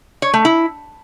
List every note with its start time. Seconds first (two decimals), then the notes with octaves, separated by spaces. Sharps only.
0.22 C#5
0.34 A3
0.45 E4